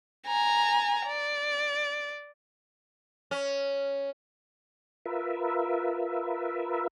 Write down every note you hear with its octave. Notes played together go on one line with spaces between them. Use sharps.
G#5 A#5
D5
C#4
F4 A#4 B4 E5